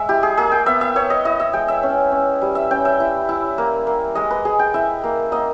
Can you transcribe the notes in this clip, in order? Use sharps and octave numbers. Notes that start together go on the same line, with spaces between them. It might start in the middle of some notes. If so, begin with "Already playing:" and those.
Already playing: G#3 E5
E4 G4
G#4
A#3 G#4
G5
B3 E5
E5
B3 C#5
D#5
E4 D#5
E5
G#3 G5
E5
C#4
C#4
G3
E5
C#4 G5
E5
E4
E4
A#3
A#3
G#3 D#5
B4
G#3 G#4
G5
E4 E5
A#3
A#3 D#5